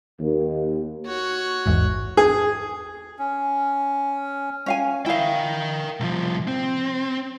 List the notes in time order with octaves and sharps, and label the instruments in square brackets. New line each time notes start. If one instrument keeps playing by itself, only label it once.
[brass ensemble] D#2
[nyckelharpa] F#4 C#5
[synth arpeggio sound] A1 E2 G#2
[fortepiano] G#4
[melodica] C#4
[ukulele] C#4 F5 G#5
[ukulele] E4 F5 [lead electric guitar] A#4 G5
[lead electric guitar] C2 F3
C4